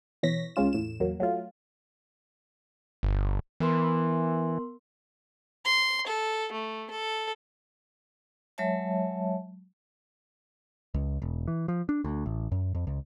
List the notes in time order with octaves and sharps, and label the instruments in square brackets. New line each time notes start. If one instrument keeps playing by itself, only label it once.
[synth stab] B2 E3 C#5 A#6 B6
C#2 G#3 C#4 F4 E7
E2 A2 E7
E2 F#3 A#3
F#3 A3 F4
[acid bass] G1
[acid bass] E3 [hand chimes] B3 A#4 C6
[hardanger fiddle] C6
A4
A3
A4
[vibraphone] F#3 G#3 C#5 E5 A5
[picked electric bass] C#2
E1
E3
F3
D4
D2
A1
F#2
F2
C#2